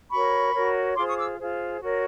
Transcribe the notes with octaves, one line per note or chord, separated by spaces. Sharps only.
F#4 A#4 C#5 B5 C#6
F#4 A#4 C#5
F4 G#4 C5 C6 D6
C#6 D#6
D6 E6
F4 G#4 C5
F#4 A#4 C#5